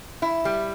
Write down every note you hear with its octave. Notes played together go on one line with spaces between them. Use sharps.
E4
G3